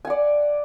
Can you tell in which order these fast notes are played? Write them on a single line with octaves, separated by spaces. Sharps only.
G#5 F#5 D5